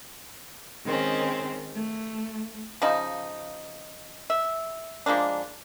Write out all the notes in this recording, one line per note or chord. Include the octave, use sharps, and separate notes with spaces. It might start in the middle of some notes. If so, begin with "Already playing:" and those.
D#3 G#3 C4 C#4
A3
C#3 F3 D#4
E5
F3 G#3 A#3 D4